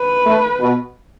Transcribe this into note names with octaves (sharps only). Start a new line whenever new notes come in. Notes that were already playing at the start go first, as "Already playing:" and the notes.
Already playing: B4
A3
B2